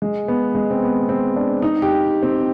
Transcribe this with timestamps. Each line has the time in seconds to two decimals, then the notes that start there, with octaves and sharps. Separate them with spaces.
0.02 G#3
0.28 B3
0.55 G#3
0.71 C4
0.83 B3
1.09 C4
1.36 D4
1.62 D#4
1.82 G4
2.23 C4